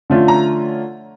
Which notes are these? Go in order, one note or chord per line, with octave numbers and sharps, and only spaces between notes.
D3 F3 A3 C#4 F4
A#5